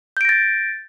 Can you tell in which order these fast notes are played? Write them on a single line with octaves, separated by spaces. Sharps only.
G6 D7 A#6 A6